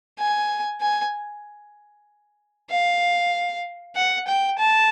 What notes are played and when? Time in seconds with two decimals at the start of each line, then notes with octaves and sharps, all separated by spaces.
0.19 G#5
0.81 G#5
2.70 F5
3.96 F#5
4.27 G5
4.58 A5